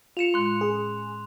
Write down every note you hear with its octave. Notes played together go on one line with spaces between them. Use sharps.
F4 C#7 E7 F7
A2 G#3 C6 F#6
C#4 G#4